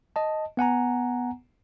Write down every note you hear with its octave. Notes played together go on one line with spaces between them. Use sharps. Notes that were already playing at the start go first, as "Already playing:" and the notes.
D#5 A5
B3 F#5 G#5 A#5